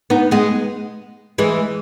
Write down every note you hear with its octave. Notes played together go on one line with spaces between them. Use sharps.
B3 D#4
G#3 B3
E3 G#3